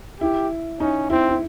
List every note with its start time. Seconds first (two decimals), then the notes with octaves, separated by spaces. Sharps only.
0.20 E4 G4
0.80 C#4 D#4
1.10 C4 E4
1.29 E4